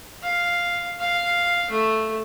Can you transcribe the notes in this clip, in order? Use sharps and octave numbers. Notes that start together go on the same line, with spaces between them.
F5
F5
A3